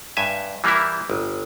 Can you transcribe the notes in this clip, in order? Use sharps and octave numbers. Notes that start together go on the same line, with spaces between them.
G2 E5 G#5
E3 G3 A#3 E4
G1